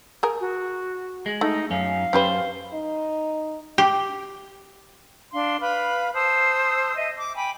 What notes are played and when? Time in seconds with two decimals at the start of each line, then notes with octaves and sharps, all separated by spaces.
0.23 G#4 A#4
0.40 F#4
1.26 G#3
1.41 A3 D#4
1.70 F#2 C#4 F5
2.13 F#2 C#4 G4 B4 C5
2.74 D#4
3.78 G4
5.33 D4 F5 C6
5.61 B4 F5 B5 F6
6.14 C5 A5 D#6 E6
6.96 D#5 E5
7.18 D6
7.35 G5 G#5 B5